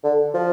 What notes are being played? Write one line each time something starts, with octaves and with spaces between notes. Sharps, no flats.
D3
F3